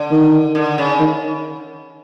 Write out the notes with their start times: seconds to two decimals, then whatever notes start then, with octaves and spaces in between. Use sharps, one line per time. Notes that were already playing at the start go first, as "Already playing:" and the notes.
Already playing: D3
0.11 D#3
0.55 D3
0.78 C#3
1.00 D#3